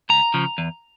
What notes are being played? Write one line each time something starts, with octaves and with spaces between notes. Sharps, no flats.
C#2 A#5
C#3 F3
E2